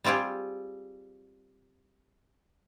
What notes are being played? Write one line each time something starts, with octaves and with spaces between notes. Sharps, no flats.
G3 C4 F4 G4 G#4